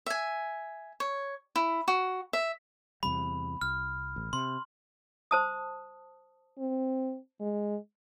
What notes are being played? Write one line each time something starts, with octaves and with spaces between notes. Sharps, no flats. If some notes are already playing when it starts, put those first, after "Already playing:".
E5 G#5
C#5
E4
F#4
E5
E2 C3 G3 B5
C2 F6
A1
C3 C6
C5 A5 D#6
C4
G#3